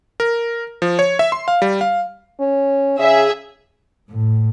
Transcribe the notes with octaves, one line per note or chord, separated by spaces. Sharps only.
A#4
F3
C#5
E5
C6
F5
G3
F5
C#4
C#3 G#4 E5
A2